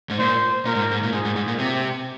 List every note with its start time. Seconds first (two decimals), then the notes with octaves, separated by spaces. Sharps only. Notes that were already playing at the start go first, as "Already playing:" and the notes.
0.10 G#2
0.19 A#2 C5
0.65 A#2 A#4
0.75 G#2
0.91 G#2
1.03 A#2
1.12 G#2 G#4
1.25 G#2
1.36 G#2
1.48 A#2
1.59 C3 G4